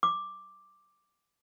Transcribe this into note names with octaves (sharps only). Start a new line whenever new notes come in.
D6